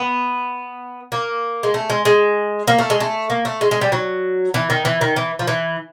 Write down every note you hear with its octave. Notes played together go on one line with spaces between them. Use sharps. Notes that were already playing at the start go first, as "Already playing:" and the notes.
Already playing: B3
A#3
G#3
A3
G#3
G#3
A#3
A3
G#3
A3
A#3
A3
G#3
G#3
G3
F#3
E3
D#3
E3
D#3
E3
F3
E3